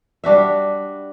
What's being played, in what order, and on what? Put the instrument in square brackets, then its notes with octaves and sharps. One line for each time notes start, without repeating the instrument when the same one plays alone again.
[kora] G3 D4 F#4 E5